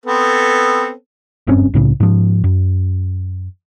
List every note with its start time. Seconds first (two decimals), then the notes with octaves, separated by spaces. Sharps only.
0.06 B3 C4 A4
1.47 F#1 G2 C4 C#4
1.74 C2 A2 C#3
2.00 G#2 F3
2.44 F#2